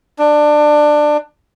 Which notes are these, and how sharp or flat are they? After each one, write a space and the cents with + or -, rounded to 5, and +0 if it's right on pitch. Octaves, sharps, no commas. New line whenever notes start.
D4 +20